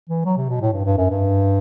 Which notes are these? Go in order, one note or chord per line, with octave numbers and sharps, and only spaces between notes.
E3
F#3
C3
B2
A2
G2
G2
F#2
G2